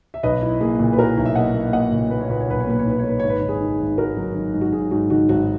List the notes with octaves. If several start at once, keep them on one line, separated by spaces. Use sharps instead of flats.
E5
B1 B4 D#5
E4
A#3 G#4
A#2
B4
E4 F#4 A#4
B1
E5
A#3 D#5 F#5
A#3
A#3 D#5 F#5
A#2
A#3 B4
C#5
A#2 B4
C#5
B1 B4
C#5
A#3 B4
C#5
B1 B4
A#3 C#5
B4
G#1 C#5
B4
D#3 C#5
G#4 B4
D#3
G#1
G#2 F#4 A#4
F#3
D#3
G#2
F#4
G#2 G#4
G#2 F#4
D#3 F#4
G#1 F#4